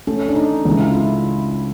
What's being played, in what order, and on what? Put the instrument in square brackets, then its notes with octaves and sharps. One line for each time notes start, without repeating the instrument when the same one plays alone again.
[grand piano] A3 [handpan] C#4
[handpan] D4
[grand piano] A3 [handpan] D#4
[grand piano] C#2
[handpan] E4
F4
E4